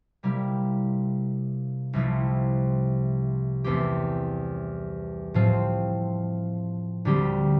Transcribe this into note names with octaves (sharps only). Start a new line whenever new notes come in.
C3 G3 A#3 E4
C2 C3 F3 A3 E4
E2 E3 A3 C4 G4
A2 F3 C4
D2 D3 G3 C4 G4